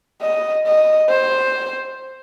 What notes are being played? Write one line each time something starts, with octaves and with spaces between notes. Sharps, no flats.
D#5
D#5
C5